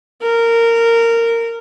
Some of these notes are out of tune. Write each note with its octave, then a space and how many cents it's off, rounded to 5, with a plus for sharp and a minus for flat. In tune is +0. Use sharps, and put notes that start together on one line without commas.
A#4 -15